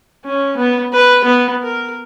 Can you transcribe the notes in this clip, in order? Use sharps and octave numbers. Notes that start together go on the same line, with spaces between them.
C#4
B3
B4
B3
A#4